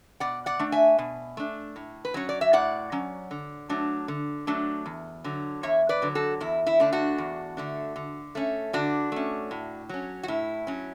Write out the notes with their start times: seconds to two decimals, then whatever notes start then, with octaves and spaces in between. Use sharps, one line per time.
0.20 B2 D5 F#5
0.46 D5 F#5
0.59 A3 D4
0.72 E5 G#5
0.98 B2
1.37 A3 D4
1.76 A2
2.05 B4
2.14 F#3 C#4 C#5
2.29 D5
2.41 E5
2.53 A2 D5 F#5
2.92 F#3 C#4
3.31 D3
3.69 F#3 A3 D4
4.08 D3
4.47 F#3 A3 D4
4.86 E2
5.24 D3 F#3
5.63 E2 C#5 E5
5.89 B4 D5
6.02 D3 F#3
6.15 F#4 A4
6.41 E2 E4
6.66 E4
6.80 D3 A3 D4
6.92 D4 F#4
7.18 E2
7.57 D3 A3 D4
7.96 D3
8.35 A3 C#4
8.73 D3 D4 F#4
9.12 A3 C#4
9.51 A2
9.89 F#3 C#4
10.23 F#4
10.28 A2 E4
10.67 F#3 C#4